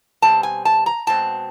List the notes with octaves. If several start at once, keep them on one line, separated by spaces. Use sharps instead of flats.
B2 G3 C4 A5
G#5
A5
A#5
E2 B2 G#3 C4 A5